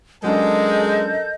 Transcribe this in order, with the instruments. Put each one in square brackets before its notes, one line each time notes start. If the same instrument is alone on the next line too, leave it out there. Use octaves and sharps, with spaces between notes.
[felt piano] F#3 C#4 D4 [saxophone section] G#3 [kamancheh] A4 A#4 [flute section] D#5 G6